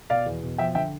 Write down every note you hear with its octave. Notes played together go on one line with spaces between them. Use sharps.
B2 D5 F5
E2
B2
F3 E5 G5
D3 E5 G5